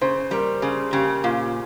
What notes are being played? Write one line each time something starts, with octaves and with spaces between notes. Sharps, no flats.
C#3 C5
G3 A#4
C#3 G#4
C#3 G4
A#2 F4